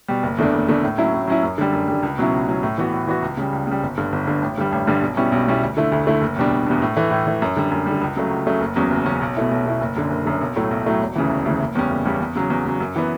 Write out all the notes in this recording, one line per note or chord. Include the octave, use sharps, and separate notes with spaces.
B2 G3
F#1
E2 D3 A3 D4
F#1
E2 D3 A3 D4
A2
F#3 C#4 E4
A2
F#3 C#4 E4
F#2
D3 G3
F#2
D3 G3
C#2
B2 F#3 C#4 E4
C#2
B2 F#3 C#4 E4
A2
E3 B3 F#4
A2
E3 B3 F#4
C#2
C#3 G3
C#2
C#3 G3
G1
G2 D3
G1
G2 D3
A1
G2 D3 G3
A1
G2 D3 G3
B1
B2 G3 C#4 E4
B1
B2 G3 C#4 E4
D2
D3 A3 E4
D2
D3 A3 E4
F#1
E2 B2 G3 D4
F#1
E2 B2 G3 D4
A2
E3 A3
A2
E3 A3
F#2
D3 G3
F#2
G3
D3
C#2
C#3 F#3 A3
C#2
C#3 F#3 A3
F#1
E2 C#3 F#3 C#4
F#1
E2 C#3 F#3 C#4
B1
B2 A3 E4
B1
B2 A3 E4
F#1
F#2 D3
F#1
F#2 D3
B1
A2 F#3 A3 E4
B1
A2 F#3 A3 E4
E1
D2 C#3 E3
E1
D2 C#3 E3
F#1
E2 C#3 G3 C#4
F#1
E2 C#3 G3 C#4
E2
C#3 F#3
E2
C#3 F#3
F#2
E3 B3